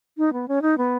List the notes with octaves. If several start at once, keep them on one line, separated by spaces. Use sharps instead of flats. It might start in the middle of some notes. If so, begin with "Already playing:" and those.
D#4
B3
C#4
D#4
B3